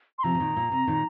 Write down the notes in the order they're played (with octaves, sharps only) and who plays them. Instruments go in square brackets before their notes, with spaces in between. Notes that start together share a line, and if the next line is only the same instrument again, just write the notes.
[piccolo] C6
[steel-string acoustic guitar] C3 F3 [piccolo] A#5
[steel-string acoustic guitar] C3
A#2 D#3
A#2
C3
A#2 D#3